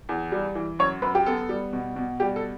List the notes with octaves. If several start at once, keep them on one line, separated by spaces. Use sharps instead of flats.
E2
G3
E3
F#2 C#5
F#2 B4
G4
B3 A4
G3
B2
B2
G3 G4
A4